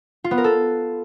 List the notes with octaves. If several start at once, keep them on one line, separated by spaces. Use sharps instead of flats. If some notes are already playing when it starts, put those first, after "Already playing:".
F4
B3
A#4
A4